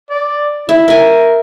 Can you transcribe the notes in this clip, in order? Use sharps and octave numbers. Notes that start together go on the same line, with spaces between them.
D5
E4 E5
A#4 E5 G#5